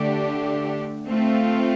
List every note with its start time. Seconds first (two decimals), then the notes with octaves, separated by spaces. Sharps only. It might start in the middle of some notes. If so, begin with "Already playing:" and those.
Already playing: D3 A3 D4 G4
1.07 A3 C4 F4